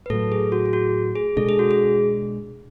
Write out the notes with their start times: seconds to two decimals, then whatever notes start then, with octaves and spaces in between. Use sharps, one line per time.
0.06 B4
0.10 A2 A4
0.13 F#3 A3
0.32 G#4
0.52 F#4
0.66 G#4
0.73 F#4
1.16 G#4
1.37 B2 G#3 D4 A4
1.49 G#4
1.59 F#4
1.71 G#4